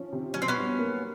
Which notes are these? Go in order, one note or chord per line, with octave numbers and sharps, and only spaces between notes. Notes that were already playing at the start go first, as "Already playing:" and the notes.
Already playing: F3 C#4
C3
F#3 C#4
C4
B3 C#4
G2
A#3